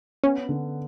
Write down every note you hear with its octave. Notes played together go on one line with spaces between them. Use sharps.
B3 C#4
D3